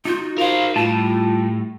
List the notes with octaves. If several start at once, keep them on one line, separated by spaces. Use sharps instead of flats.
D#4 F4 F#4 G6
A#4 C5 F5
A2 G3 F4 A5